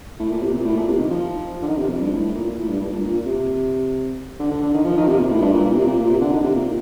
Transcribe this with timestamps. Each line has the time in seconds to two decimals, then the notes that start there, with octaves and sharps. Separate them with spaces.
0.19 A2
0.31 A#2
0.42 C3
0.54 A#2
0.65 A2
0.76 A#2
0.88 C3
0.99 D#3
1.10 F3
1.62 D3
1.68 D#3
1.78 C3
1.90 F2
2.01 G2
2.13 A2
2.35 A#2
2.58 A2
2.69 G2
2.81 G2
2.92 A#2
3.04 A#2
3.26 C3
4.40 D3
4.51 D3
4.62 D3
4.74 D#3
4.85 F3
4.97 D#3
5.08 C3
5.20 A#2
5.31 A2
5.42 G2
5.53 A#2
5.65 A#2
5.76 C3
5.88 A#2
5.99 A#2
6.10 C3
6.21 D3
6.33 D#3
6.44 C3
6.55 A#2